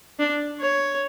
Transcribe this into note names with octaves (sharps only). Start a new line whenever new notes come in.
D4
C#5